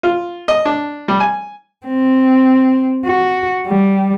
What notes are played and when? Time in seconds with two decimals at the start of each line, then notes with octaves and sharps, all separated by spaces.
0.03 F4
0.48 D#5
0.65 D4
1.08 G3
1.20 G#5
1.87 C4
3.06 F#4
3.67 G3